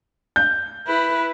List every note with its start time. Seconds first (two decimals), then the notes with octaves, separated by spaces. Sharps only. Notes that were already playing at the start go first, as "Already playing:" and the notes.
0.36 G6
0.87 E4 B4